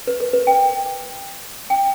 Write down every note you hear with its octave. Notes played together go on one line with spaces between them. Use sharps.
B4
A#4
B4
G5
G5